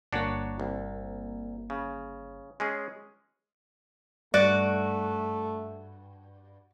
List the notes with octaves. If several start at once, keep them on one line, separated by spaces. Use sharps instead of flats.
G1 A#3 D4 F#4 C#5
C2
C#3
G#3 C#4 G#4
G2 A3 F#4 D5